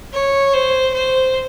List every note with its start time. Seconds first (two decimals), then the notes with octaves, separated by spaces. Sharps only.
0.13 C#5
0.53 C5
0.93 C5